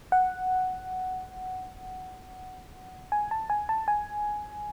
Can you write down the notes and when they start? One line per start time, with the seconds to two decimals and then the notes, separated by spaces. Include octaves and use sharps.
0.12 F#5
3.12 G#5
3.31 A5
3.50 G#5
3.69 A5
3.88 G#5